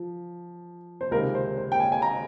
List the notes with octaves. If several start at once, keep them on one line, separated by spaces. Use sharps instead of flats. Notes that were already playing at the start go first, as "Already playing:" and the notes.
Already playing: F3
C5
C#2 C3 D#3 A#4
C5
C5
G5
G#5
G#5
A#5